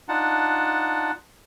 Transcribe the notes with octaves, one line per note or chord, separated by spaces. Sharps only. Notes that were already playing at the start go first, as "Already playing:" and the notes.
D4 D#4 F4 F#5 A5